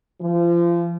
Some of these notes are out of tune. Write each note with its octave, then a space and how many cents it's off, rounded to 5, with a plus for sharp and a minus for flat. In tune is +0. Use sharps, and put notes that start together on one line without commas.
F3 -30